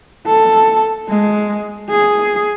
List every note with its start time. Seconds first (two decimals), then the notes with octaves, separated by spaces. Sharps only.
0.27 A4
1.09 G#3
1.90 G#4